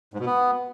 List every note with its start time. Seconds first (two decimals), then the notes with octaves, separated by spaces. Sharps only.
0.14 G#2
0.20 B2
0.26 B3